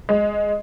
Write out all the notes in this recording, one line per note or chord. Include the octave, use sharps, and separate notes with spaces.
G#3